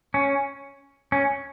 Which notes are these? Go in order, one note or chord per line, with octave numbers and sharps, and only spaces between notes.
C#4
C#4